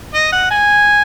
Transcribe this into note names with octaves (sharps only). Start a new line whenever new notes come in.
D#5
F#5
G#5